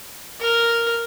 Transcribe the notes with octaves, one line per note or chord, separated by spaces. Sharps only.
A#4